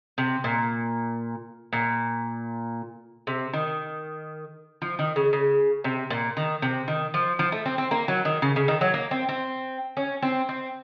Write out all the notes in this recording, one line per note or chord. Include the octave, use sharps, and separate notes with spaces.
C3
A#2
A#2
C3
D#3
F3
D#3
C#3
C#3
C3
A#2
D#3
C3
D#3
F3
F3
A3
C4
C4
A#3
F#3
D#3
C#3
C#3
D#3
F#3
A#3
C4
C4
C#4
C4
C4